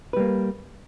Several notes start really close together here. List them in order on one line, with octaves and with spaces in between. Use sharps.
B4 G3 A#3